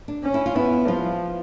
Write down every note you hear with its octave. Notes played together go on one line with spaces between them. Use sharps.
D4
C#4
E4
F4
B3 E4
F3 F4